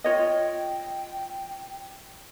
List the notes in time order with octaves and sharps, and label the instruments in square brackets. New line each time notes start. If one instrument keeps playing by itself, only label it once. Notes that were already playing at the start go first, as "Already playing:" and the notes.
[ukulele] F4 C#5 D#5 [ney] G5